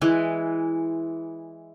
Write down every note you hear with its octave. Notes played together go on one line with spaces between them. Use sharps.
E3 G#3